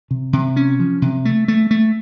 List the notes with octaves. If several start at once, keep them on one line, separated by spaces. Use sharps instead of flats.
C3
C3
C#4
F3
C3
A3
A3
A3